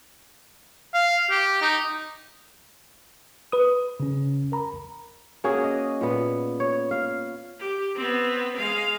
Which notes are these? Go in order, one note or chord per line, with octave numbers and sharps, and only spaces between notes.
F5
G4
D#4
B4 D#6
C#3 C#4
A#4 A#5 B5
A#3 C#4 F#4 G#4
D#5
A#2 B3
C#5
F5
G4
B3 C4
G#3 F5